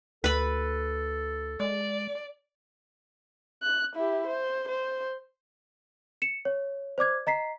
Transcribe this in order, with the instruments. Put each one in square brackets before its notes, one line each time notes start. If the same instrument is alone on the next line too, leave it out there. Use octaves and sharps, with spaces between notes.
[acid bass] D2 [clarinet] A4 [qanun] B4 B5
[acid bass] G#3 [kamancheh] D5
[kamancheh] F#6
E4 G4
C5
C5
[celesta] C#7 E7
C#5
C5 D5 D6 G#6
D#5 A#5 B6 C7